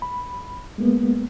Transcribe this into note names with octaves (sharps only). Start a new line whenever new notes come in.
B5
G#3 A#3 B3